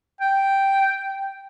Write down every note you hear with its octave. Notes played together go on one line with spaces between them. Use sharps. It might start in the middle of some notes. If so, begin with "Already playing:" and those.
G5